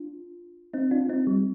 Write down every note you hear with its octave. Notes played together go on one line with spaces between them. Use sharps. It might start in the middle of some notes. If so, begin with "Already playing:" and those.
Already playing: D4 F4
C4 D#4
D4 F4
C4 D#4
G3